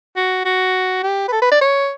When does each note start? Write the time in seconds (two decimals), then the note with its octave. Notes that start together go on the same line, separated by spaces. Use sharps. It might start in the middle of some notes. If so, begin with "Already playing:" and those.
0.17 F#4
0.45 F#4
1.03 G4
1.28 B4
1.32 A4
1.42 B4
1.51 D5
1.61 C#5